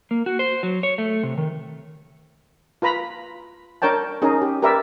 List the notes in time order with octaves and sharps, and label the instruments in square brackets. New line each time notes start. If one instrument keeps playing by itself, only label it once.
[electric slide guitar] A#3
F#4
C5
F#3
C#5
A3
C3
D#3
[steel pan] F4 B4 A#5 B5
D4 A#4 C#5 G5 A5
C#4 D#4 G#4 A#4
G4
G4 A#4 B4 D5 E5